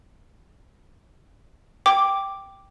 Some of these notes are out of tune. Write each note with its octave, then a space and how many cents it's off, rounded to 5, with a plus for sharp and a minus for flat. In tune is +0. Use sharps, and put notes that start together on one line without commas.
G5 +0 D6 +0